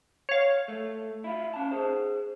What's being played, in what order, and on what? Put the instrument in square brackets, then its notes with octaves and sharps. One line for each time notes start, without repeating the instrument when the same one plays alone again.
[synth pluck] C#5 F5
[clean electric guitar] A3
E4 F4
C#4 A5
G#4 C5